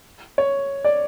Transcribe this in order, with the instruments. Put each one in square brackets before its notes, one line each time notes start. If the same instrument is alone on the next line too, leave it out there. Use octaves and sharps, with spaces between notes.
[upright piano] C#5
D5